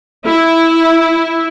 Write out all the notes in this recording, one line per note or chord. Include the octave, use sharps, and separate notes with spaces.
E4